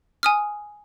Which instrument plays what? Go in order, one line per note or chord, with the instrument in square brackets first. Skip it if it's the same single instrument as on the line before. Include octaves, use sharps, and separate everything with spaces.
[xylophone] G#5 D#6 F6